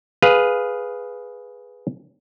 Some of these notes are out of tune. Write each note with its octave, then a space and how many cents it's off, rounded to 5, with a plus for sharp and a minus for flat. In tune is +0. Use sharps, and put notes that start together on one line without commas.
G#4 +0 B4 +0 F5 +10